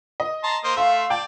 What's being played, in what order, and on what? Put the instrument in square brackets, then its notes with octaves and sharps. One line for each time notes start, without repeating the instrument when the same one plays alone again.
[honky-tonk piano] D#5
[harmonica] A5 A#5 C6
A#3 C5 D#5
[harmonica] A3 E5 [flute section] F5 [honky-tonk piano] C6
[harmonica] D5 [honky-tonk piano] G5 A5